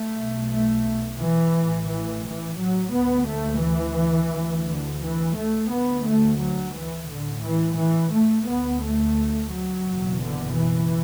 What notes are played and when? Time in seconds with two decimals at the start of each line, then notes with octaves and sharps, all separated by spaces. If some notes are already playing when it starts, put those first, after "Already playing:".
Already playing: A3
0.17 B1 B2
0.52 A3
1.21 E3
1.56 A1 A2
1.90 E3
2.25 E3
2.59 F#3
2.94 D2 B3
3.30 A3
3.64 E3
4.34 D2
4.67 D3
5.03 E3
5.37 A3
5.71 D2 B3
6.06 A3
6.41 F#3
6.76 E3
7.09 A1 A2 D3
7.44 E3
7.79 E3
8.14 A3
8.48 D2 B3
8.83 A3
9.52 F#3
9.86 F#1 E2 B2
10.22 D3
10.56 E3